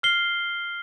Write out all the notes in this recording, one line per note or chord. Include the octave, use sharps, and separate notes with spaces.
F6 C7 G7